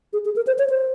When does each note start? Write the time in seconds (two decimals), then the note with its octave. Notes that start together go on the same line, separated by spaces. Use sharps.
0.13 G#4
0.25 G#4
0.36 A#4
0.47 C5
0.58 C#5
0.69 C5